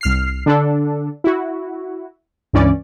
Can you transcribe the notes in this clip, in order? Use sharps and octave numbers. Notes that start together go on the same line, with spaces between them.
C2 F6 C7
D3 D4 A4
E4 F#4
C#2 G2 E3 C#4 D5